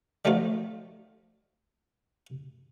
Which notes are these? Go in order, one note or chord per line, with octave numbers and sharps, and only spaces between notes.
D3 D#3 F3 F#3 A3 F4